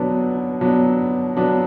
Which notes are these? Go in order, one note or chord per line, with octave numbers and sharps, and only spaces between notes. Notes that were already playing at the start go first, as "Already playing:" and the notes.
Already playing: B2 F#3 B3 D4
B2 F#3 B3 D4
B2 F#3 B3 D4